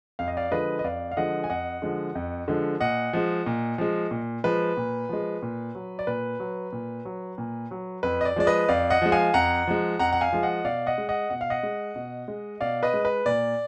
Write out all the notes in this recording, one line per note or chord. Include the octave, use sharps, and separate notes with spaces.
F2 F5
D#5
D5 F5
D3 F3 G#3 B4 D#5
D#5
F2 D5 F5
F5
D3 F3 G#3 D#5 F#5
G#5
F2 D#5 F#5
D3 F3 G#3
F2
D3 F3 G#3
A#2 D#5 F#5
F3 G#3
A#2
F3 G#3
A#2
F3 G#3 B4
A#2
F3 G#3
A#2
F#3
D5
A#2 B4
F#3
A#2
F#3
A#2
F#3
F2 B4
D#5
D5
F3 G#3 D5
B4 D#5
F2 D5 F5
D#5 F#5
F3 G#3
F5 G#5
F2 F#5 A#5
F3 G#3
F2 F#5 A#5
F#5
F5 G#5
F3 G#3
D#5 F#5
B2 D5 F5
D#5 F#5
G#3
D#5 F#5
B2 F#5
F5
D#5 F#5
G#3
B2
G#3
B2 D5 F5
B4 D#5
G#3
B4
A#2 D5